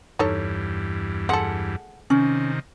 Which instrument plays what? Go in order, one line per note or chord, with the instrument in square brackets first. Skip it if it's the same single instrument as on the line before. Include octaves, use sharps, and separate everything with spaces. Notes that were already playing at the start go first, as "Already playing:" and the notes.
[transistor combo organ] E2 G2 [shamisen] D#4 A4 C#5
[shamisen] G#3 A4 [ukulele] F#5
[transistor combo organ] C3 D#3 [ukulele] C#4